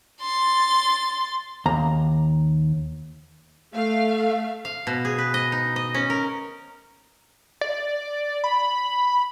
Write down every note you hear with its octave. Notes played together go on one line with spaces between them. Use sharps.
C6 A6
D#2 A#5
A3 F5
F5
B2
G#4
B4
D#5
D#4
D#5
C#4
A#4
D5
B5